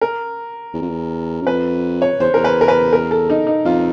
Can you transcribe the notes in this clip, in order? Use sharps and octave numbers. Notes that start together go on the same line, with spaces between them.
A#4
E2
F2
E2
F#2
F2 B4
C#5
E2 C5
E2 A#4
B4
A#4
B4
A#4
A4
D#4
D#4
F2 F4